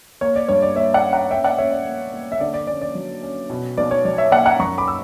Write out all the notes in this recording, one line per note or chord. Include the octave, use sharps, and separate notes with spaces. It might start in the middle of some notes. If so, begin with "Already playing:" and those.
A#3 C#5
D5
G2 C#5
D5
A#3 C#5 E5
D5 F#5
C#4
F#5 A#5
C#4 E5 G5
D5 F#5
C#4 C#5 E5
D5
A#3
A#3
E5
D3 D5
D5
C#4 D5
D5
F#3
C#4
B2
B1 D5
C#5
F#3 D5
C#5 E5
A#3 D5 F#5
F#5 A#5
F#2 A#5 C#6
B5 D6
E6